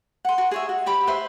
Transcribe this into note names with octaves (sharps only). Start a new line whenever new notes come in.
F#5 C6
F#4 A#4
G#4 C#5 E5
F#4
G4 C#5 B5
B4 C5 E5